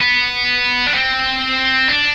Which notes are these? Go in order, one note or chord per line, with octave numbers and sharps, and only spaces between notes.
B3
D4
C4
D4